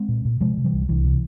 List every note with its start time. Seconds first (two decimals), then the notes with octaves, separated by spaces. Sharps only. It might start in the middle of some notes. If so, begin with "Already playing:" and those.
Already playing: G#3 C4
0.08 A#2
0.25 A#2
0.41 C3 F3 G#3
0.57 C3
0.64 E3 G3
0.73 C2
0.89 C2 E3
1.05 C3